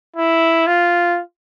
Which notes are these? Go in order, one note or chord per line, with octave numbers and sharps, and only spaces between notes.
E4
F4